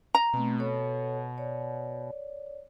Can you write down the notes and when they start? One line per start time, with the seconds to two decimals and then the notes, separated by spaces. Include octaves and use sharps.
0.15 A#5
0.34 B2 A3 C4
0.59 A4 C#5
1.38 C#5 D5